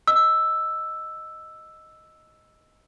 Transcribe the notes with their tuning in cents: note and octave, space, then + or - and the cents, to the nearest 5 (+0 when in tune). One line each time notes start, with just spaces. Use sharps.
D#5 +0 E6 +0